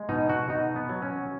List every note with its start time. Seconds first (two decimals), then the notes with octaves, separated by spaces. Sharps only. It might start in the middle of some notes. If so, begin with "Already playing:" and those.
Already playing: G#3
0.09 B2 D#4
0.29 F#4
0.49 B2 D#4
0.76 B3
0.89 F#3
1.02 C#4